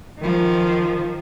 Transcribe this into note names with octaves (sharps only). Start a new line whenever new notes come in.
D#3 F3